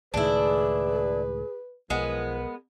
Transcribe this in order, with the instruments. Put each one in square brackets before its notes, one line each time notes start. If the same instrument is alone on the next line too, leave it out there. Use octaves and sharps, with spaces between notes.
[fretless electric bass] C#2 A2 D#3 [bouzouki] D4 E4 [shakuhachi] G#4 [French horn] B4
[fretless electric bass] B1 [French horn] F3 [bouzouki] G#3 B3 [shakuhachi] A#4